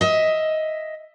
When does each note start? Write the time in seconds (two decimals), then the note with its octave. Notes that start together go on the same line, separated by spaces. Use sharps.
0.01 D#5 E5